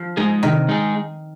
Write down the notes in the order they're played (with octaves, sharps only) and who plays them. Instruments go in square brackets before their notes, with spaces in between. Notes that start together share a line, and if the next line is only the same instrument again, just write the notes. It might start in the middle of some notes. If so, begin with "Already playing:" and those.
Already playing: [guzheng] F3
[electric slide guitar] G#3 D#4 G#4
[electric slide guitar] C3 [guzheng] D#3
[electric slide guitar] G#3 D#4 G#4